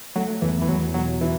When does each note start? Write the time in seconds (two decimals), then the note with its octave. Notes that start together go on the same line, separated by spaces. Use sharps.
0.15 F#3 A3
0.42 E2 E3
0.62 E3
0.69 E2 F#3
0.94 B2 F#3
1.20 E3 E4